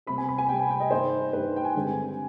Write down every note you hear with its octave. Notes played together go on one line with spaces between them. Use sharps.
C3 G3 C4 B5
G#5
B5
G#5
C3 G3 C4 G5
G#5
G5
D#5
G2 D#3 G3 C5
G2 D#3 G3 B4
G5
G#5
G2 D3 G#3 C4